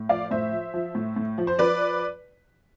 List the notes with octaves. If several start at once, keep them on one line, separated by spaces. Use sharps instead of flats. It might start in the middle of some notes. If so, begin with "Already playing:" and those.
Already playing: A2
F3 D5 F5
A2 C5 E5
F3
F3
A2
A2
F3
C5
F3 B4 D5